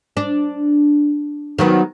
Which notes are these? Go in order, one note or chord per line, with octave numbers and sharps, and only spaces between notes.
D4
D#3 F#3 B3